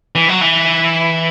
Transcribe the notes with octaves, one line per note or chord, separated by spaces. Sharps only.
E3
F#3
E3